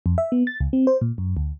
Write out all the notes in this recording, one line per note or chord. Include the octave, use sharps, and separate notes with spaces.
F2
E5
B3
A6
C#2
C4
C5
A#2
F#2
D2